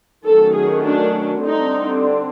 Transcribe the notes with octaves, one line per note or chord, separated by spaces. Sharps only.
D#3 F#3 A3 C#4 A4
G#4
D4
D3 G3 C4 D#4